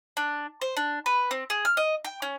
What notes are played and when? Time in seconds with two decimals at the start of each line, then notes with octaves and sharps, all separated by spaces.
0.17 D4
0.62 C5
0.77 D4
1.06 B4
1.31 C4
1.50 G#4
1.65 F6
1.77 D#5
2.05 G5
2.22 C#4